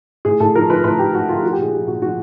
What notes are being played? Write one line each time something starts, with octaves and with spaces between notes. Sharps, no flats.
A2 G#4
A2 A4
F3 A#4
F3 B4
A2 B4
A3 G4
F3 F#4
F3 F4
G4
F3 F#4
G4
A#2 G#4
F3 G4
A#2 F#4
F3 F#4